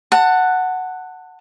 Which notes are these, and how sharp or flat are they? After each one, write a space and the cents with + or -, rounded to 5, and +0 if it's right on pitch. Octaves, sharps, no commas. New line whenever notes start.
F#5 +0 A5 +25